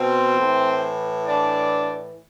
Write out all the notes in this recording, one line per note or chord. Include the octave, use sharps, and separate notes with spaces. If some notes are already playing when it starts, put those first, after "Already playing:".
Already playing: B2 C4 C5
A2 E3
D4 D5